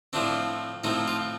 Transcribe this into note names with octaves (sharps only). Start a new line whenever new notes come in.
A2 F3 A3 C4 D4
A2 F3 A3 C4 D#4
F4